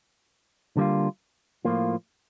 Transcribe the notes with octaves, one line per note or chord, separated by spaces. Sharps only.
D3 G3 A#3 F4
A2 F3 A#3 F4